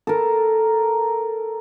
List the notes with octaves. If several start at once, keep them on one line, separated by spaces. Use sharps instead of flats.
A4 A#4